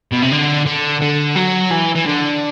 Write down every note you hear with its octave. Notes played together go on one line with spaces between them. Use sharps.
B2
C3
D3
D3
D3
F#3
E3
E3
D3